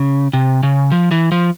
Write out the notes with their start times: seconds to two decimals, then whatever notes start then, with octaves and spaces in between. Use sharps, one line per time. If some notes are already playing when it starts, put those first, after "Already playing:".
Already playing: C#3
0.33 C3
0.63 C#3
0.92 F3
1.11 E3
1.32 F3